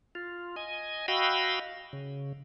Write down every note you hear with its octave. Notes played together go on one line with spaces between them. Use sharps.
F4
D#5 G#5
F#4 D#5 F5 G5 B5 E6
C#3